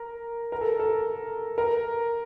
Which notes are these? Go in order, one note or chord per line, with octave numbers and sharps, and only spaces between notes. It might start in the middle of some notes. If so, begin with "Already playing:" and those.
Already playing: A#4
A#4
A4
A4
A#4